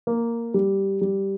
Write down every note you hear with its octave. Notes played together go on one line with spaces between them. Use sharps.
A#3
G3
G3